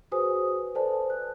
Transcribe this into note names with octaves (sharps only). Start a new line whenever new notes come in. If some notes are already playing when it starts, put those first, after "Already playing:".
F#4 G#4 B4 C5 G#5 D#6
A4 B4 C5 D5 G#5 A5
F#6